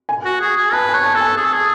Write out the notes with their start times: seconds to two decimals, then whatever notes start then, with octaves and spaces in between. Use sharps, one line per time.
0.09 G#5
0.25 F#4
0.40 G#4
0.57 G#4
0.73 B4 A5
0.89 G#5
0.94 C#5
1.04 A5
1.15 A4
1.21 G#5
1.37 G#4
1.45 A4
1.53 G#4